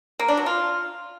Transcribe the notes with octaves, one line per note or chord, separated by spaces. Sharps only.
A#3
D4
F#3
F4